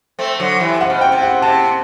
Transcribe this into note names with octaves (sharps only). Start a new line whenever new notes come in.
A3 C4
D3 F#3
C3 E3
C3 F#5
B2
C3 G5
C3
F#5
C3 A5